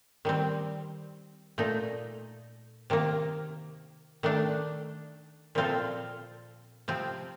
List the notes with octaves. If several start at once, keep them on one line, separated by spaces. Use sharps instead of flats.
D#3 G3 C4
A#2 A3 D#4
C3 D#3 A#3
D#3 A3 D4
A#2 F3 C4 F4 A4
C3 F3 C4